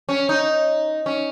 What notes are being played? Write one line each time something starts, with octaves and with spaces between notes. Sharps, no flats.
C#4
D#4
C#4